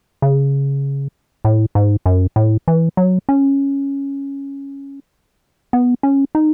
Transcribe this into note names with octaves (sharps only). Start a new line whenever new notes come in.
C#3
A2
G#2
F#2
A2
E3
F#3
C#4
B3
C#4
D#4